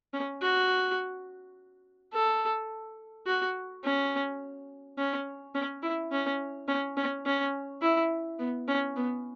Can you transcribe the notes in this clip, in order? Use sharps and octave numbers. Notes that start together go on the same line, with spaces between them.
C#4
F#4
A4
F#4
C#4
C#4
C#4
E4
C#4
C#4
C#4
C#4
E4
B3
C#4
B3